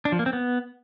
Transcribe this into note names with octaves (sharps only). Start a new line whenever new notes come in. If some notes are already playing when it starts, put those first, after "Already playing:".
D4
F3
A#3
C4
B3